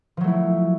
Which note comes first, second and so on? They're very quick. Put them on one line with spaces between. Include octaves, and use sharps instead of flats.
F3 F#3 A3 E4